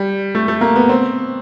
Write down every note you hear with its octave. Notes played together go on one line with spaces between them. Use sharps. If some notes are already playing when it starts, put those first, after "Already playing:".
Already playing: G3
A3
A3
A#3
B3
C4